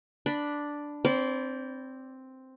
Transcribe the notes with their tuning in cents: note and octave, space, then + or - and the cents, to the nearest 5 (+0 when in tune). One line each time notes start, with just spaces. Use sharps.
D4 +0 B5 -5
C4 +0 D5 -35 B5 +0